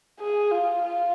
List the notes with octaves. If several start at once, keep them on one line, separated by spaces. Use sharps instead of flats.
G#4
F4
F4